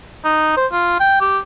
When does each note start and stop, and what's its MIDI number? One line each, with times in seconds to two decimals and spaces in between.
0.25 0.54 63
0.57 0.67 72
0.72 0.95 65
1.00 1.17 79
1.21 1.39 67